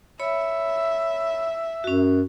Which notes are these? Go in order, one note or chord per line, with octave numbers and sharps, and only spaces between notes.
C#5 E5 B5
F#2 C#4 F#4